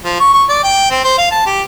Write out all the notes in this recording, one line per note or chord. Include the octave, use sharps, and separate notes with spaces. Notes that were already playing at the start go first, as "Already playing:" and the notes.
F3
C#6
C#6
D5
G5
C4
C5
F5
A5
G4